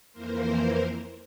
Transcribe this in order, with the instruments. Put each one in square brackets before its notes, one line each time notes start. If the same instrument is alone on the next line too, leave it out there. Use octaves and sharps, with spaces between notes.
[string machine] F2 E3 A#3 A#4 C5